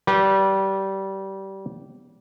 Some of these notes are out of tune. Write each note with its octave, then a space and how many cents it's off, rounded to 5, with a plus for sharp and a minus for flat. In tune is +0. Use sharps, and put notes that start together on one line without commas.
G3 -20 B4 -25